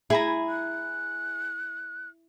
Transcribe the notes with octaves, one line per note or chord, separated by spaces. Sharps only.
E4 G#4 G#5 A#5
F#6